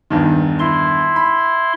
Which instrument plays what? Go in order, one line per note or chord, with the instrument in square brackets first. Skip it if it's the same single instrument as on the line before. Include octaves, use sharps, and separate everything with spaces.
[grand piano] E2 G2 D#3
[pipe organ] E4 C6
[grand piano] B5